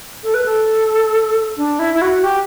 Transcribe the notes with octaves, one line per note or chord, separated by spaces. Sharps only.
A4
B4
A4
D4
E4
E4
F#4
G4